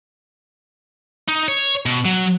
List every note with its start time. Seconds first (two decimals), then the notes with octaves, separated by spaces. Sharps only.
1.28 D#4
1.48 C#5
1.86 B2
2.05 F#3